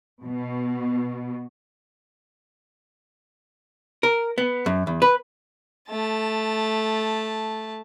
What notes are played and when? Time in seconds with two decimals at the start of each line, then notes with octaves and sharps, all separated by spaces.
0.23 B2
4.03 A#4
4.38 B3
4.66 F#2
4.87 E2
5.02 B4
5.90 A3 A5